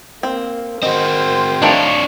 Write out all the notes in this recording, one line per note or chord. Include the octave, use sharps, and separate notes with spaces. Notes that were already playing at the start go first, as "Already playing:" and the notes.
A#3 C4
C4 F#4 A#4 C5 D#5
D#3 F3 A3 D4 C#5